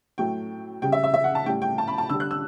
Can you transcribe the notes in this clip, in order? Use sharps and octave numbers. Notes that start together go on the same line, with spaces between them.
A2 F#3 A3 G5
C#3 G3 G5
E5
E5
E5
F#5
A5
A2 G3 G5
G5
A5
B5
A5
D3 G3 E6
F#6
E6